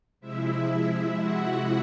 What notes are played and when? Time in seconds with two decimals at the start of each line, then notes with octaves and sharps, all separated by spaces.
0.20 C3 F3 G#3 E4 E5
1.19 F#4 F#5